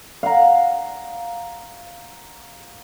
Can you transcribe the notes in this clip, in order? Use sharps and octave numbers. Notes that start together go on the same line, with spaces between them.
F5 F#5 A#5